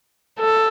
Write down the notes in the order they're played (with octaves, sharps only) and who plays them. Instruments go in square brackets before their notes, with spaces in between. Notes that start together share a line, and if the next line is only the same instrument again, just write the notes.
[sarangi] A4